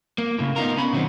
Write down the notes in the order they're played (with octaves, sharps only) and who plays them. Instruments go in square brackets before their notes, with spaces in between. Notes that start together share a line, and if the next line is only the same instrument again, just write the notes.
[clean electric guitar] A#3
A2 C#3
B3 D#4 F4 A#4
C#4 B5
B2 D#3 F#3 B3 C4